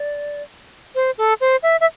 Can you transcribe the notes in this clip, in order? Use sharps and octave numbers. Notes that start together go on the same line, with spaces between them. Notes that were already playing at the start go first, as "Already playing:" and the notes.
Already playing: D5
C5
A4
C5
E5
E5